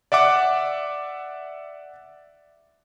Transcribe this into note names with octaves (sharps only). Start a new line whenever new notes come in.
D5 E5 F#5 D6